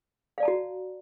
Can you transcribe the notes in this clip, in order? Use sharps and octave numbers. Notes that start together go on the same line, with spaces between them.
F#4 D5 F5 A5 A#5